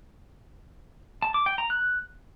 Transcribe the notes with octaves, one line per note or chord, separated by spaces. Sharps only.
A5
D6
G5
A#5
F#6